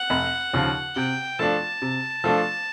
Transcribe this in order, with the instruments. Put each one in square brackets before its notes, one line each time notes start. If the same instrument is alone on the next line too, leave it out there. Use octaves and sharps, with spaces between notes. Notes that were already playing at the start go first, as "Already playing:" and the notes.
Already playing: [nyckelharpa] F#5
[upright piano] F1
D#2 C#3 F3
[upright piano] C3 [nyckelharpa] G5
[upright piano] F3 A3 D4 F4 [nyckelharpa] A5
[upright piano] C3
F3 A3 D4 F4